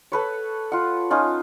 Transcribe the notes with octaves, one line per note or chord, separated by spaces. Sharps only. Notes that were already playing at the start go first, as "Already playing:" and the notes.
A4 B4 C#5
F4 F#5
C#4 D#4 F4